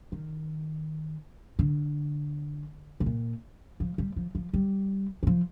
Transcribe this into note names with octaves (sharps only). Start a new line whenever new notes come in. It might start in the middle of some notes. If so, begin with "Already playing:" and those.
D#3
D3
A2
A#2
F3
G3
F3
F3
G3
G3
F3